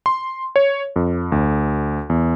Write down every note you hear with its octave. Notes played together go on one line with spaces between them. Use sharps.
C6
C#5
F2
D2
E2